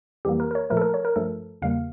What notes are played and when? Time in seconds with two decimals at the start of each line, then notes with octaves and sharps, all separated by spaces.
0.25 F2 E3 G3 A#3 G4
0.40 A#4
0.51 A#4
0.55 C#5
0.70 A#2 F3 A3 A#4
0.77 A4
0.82 A#4
0.94 C#5
1.05 A#4
1.16 G2 F3 A3 A4
1.62 E2 C#3 G3 A#3 F5